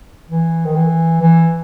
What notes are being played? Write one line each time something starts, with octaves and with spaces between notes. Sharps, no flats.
E3
D#3
E3
E3